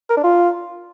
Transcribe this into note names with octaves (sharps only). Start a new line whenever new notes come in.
A#4
D4
F4